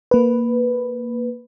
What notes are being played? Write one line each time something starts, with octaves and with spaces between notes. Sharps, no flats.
A#3 B4